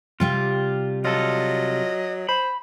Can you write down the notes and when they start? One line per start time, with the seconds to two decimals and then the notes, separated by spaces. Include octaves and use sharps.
0.20 C3 G3 F4 G4
1.05 F#3 F4 A4 D#5
2.29 C5 B5